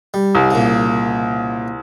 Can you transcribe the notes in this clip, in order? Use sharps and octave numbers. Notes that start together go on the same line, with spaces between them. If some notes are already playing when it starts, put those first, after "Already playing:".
G3
C2
A#2 C#3